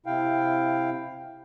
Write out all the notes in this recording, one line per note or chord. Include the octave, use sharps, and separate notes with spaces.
C3 E4 F5 G5